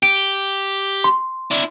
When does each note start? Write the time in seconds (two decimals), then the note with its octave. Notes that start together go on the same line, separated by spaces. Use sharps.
0.03 G4 D7
1.04 C6
1.51 D4 E4